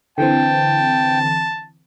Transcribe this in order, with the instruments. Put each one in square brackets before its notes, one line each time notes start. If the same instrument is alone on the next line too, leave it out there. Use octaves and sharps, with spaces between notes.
[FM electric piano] D3 E3 C4 [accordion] G5 [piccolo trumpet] A5